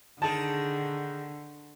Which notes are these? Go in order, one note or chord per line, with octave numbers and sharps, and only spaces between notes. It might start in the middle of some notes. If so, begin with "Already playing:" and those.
D3 D#3 G#4 A5